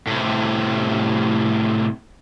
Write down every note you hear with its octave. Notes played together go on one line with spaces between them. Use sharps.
A2 C3